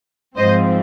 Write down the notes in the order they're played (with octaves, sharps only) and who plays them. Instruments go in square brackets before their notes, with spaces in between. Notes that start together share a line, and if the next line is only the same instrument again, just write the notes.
[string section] G#2 F3 C4 C5 D#5